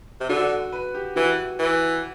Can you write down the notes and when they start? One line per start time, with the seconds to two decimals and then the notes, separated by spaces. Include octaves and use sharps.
0.21 C3
0.29 D3 F#4
0.72 B4
0.94 G4
1.16 E3 F#4
1.59 E3